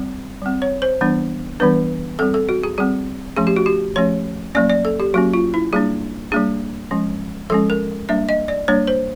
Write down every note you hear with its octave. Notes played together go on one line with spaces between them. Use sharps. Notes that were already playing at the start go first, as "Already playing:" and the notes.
Already playing: G3 C4
G3 C4
C#5
C5
E3 G3 B3 D4
E3 G3 B3 D4 B4
G3 C4 A4
A4
F#4
G#4
G3 C4 G#4
F3 A3 C#4 G#4
G4
F#4
G4
F3 A3 C#4 C#5
F#3 A#3 C#4 D5
D5
A4
G4
F#3 A#3 C#4 F#4
F4
E4
G3 A#3 D4 G#4
G3 A#3 D4 G#4
F3 G#3 C#4
F3 G#3 C#4 A4
A#4
G3 A#3 D4 E5
D#5
D5
G3 A#3 D4 C#5
C5